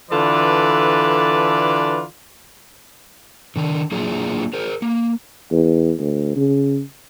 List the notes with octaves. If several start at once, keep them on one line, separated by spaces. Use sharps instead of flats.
D3 E3 F4 A4 B4 D5
D3 D#3 D4
F#3 A#3 D4 E4 F4 G#4
G#4 A#4 C5
A#3
E2
D2
C#3